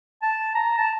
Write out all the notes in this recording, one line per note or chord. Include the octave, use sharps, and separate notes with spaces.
A5
A#5
A5